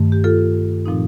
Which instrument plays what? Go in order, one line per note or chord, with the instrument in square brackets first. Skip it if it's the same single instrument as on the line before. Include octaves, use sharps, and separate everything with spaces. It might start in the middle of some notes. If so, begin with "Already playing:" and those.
Already playing: [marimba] G2 D#3 A3
G4
F4 A4
A#2 F3 C4 D#4